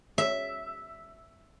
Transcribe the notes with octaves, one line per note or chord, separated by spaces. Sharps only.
E5